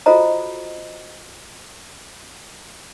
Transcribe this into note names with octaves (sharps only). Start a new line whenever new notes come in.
F4 F#4 A4 C5 D#5 A#5